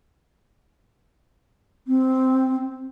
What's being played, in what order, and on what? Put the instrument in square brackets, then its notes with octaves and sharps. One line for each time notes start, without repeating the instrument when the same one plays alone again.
[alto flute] C4